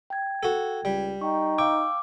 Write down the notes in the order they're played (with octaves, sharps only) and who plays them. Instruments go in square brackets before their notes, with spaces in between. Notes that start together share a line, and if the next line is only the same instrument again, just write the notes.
[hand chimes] G5 G#6
[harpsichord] F#4 A4
[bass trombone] C#2 [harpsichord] G3
[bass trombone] D#4 [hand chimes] G5 C#6
[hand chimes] F5 E6 [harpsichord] G5 [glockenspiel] D6